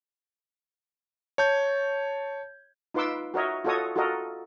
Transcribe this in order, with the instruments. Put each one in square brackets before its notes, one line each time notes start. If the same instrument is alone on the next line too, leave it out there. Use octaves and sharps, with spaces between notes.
[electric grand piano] C#5 A5 G6 G#6
[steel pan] D#4 F4 B4 C6 D6 E6
F#4 A#4 C#5 D#5 E5
F4 F#4 A4 C#5 D#5 D#6
F4 F#4 A4 A#4 D#5